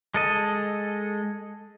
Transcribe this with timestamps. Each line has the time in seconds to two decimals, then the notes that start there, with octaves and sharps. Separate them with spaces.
0.14 G#3 A4 D#5